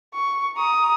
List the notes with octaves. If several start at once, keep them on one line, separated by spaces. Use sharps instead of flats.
C#6
A#5 D#6